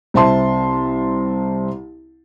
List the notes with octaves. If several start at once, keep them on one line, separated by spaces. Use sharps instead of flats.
C2 C4 E5 A5 C6